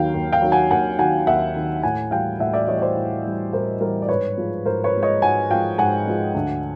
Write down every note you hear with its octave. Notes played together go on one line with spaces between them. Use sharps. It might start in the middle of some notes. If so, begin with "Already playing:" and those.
Already playing: D#2 D#3 F#3 F5 G5
D#2
F5 G5
D#3 F#3
F#5 G#5
D#2 F#5 G#5
D#3 F#3 F#5 G#5
D#2 E5 F#5
D#3 F#3
A2 F#5 G#5
E3 G3 F5 G5
A2 E5 F#5
D5 E5
E3 G3 C#5 D#5
C#5
C5 D5
A2
E3 G3
A2 A#4 C5
E3 G3 A#4 C5
D5
G#2 B4 C#5
F3 G#3
G#2 A#4 C5
B4 C#5
F3 G#3
C#5 D#5
G#2 F#5 G#5
F3 G#3 F5 G5
G#2 F#5 G#5
F3 G#3
D2